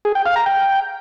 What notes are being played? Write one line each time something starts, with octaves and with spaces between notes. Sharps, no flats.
G#4
G5
F5
A#5
G5